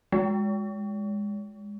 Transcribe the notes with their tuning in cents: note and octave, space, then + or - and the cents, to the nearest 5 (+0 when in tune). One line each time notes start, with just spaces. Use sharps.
G#3 -10